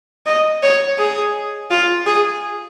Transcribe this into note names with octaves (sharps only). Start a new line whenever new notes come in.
D#5
C#5
G#4
F4
G#4